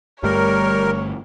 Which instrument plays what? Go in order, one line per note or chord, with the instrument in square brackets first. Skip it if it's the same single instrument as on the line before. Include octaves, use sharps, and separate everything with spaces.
[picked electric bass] G1 G2 A3 [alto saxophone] G3 [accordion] A#4 [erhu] C#5